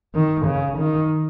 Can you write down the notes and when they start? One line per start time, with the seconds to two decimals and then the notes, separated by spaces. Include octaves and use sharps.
0.15 D#3
0.46 C#3
0.78 D#3